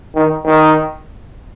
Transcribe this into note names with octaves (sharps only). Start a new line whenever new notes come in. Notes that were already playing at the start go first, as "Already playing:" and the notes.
D#3
D#3